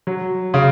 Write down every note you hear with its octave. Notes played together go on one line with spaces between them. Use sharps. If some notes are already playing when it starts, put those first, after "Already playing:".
F#3
C#3